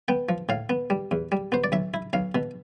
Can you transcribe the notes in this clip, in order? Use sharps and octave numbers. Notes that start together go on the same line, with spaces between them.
B3 G5
F3
A2 F5
B3
G3
E2
G3
B3 C5
D5
B1 E5
E4
B1 F5
B2